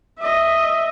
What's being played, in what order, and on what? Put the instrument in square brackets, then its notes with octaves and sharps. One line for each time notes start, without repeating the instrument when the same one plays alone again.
[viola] D#5 E5